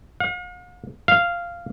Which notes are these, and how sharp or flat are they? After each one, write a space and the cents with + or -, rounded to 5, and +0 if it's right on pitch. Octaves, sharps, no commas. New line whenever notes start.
F5 +45
F5 -10